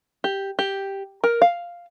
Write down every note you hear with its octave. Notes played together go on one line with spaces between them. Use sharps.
G4
G4
A#4
F5